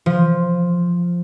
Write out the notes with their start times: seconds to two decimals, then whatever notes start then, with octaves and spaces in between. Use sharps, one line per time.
0.06 F3